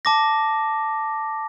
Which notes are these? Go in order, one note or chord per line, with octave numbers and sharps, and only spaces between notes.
A5 D6 A#6